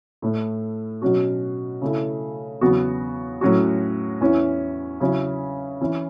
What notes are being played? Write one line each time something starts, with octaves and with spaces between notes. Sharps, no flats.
A2 A3 E4
B2 F#3 C#4 F#4
C#3 A3 E4
E2 C#3 F#3 B3 F#4
A2 F#3 C#4 F#4
E2 E3 C#4 E4
C#3 F#3 C#4 E4
E3 C#4 E4